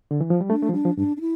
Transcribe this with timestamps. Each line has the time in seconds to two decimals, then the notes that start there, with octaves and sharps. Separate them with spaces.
0.11 D3
0.21 E3
0.30 F3
0.41 G3
0.50 A3 D4
0.62 A3
0.69 F3
0.73 G3 D4
0.85 F3
0.97 G2 D4
1.17 D4
1.21 E4